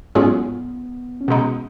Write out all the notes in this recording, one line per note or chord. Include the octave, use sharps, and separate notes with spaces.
G#2 F#3 B3 C#4 F4 G#4
C#4
B2 G#3 B3 D#4